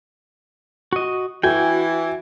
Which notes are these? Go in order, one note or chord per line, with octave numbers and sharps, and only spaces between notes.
F#4 D#5
E3 F#4 G5 G#5